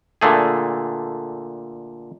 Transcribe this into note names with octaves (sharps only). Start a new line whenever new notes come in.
A#2 D3 A3 G#4